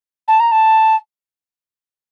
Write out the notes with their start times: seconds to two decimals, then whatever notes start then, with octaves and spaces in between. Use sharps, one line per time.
0.28 A5
0.39 A#5
0.51 A5